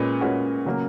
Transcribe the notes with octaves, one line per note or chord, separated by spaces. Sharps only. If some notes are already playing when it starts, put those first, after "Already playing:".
Already playing: A#2 G#3 C#4 B4
A#2 G#3 C#4 F#4 B4
C#3 F#3 A#3